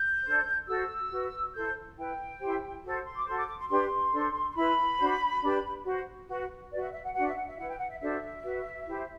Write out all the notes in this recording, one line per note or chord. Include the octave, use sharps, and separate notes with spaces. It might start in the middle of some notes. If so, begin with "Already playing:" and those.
Already playing: G6
D4 A4 C5
F#4 A4 C5 E6
F#4 B4
E4 A4 C5 G6
E4 B4 G5
E4 G4 C5
F#4 A4 C5
C6
D6
F#4 A4 C5 C6
D6
D6
C6
D4 G4 B4 C6
D4 A4 C5
C6
E4 B4 B5
D4 F#4 C5
D4 G4 B4
F#4 C5
F#4 B4
F#4 B4 D5
E5
E5
F#5
D4 F#4 B4 F#5
E5
F#5
E5
E4 B4 F#5
G5
F#5
E5
D4 F#4 A4 C5 E5
F#4 B4
E4 G4 C5